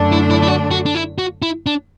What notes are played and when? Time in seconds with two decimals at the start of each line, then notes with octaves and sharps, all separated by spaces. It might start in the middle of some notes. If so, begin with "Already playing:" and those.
Already playing: F#2 D3 A3 D4
0.12 E4
0.30 E4
0.43 E4
0.47 F#4
0.71 F#4
0.86 D4
0.95 E4
1.18 F#4
1.42 E4
1.66 D4